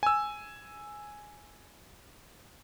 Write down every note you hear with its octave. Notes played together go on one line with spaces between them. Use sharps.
G#5 E6